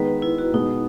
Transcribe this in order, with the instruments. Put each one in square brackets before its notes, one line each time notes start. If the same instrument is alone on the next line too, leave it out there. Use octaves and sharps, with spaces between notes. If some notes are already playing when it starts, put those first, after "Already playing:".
Already playing: [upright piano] D#3 G#3 B3 D#4 [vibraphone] B4
[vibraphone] E4
F#4
[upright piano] B2 G#3 B3 [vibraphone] D#4